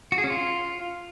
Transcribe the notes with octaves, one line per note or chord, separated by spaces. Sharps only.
F#4
G#4
C#4
F4